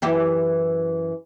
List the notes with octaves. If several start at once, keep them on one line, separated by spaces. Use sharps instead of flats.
F#2 E3 G4